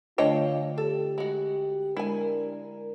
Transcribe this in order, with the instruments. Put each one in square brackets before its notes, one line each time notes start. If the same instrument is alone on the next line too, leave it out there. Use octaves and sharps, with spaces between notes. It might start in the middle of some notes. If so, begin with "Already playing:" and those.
[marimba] D3 A3 D4 [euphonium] F4 [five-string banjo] C#5 D#5 G5
[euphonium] G4 [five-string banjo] A4
[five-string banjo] G#3 F#4
[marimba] G#3 [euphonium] D4 [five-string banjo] E4 G#5 [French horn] A#4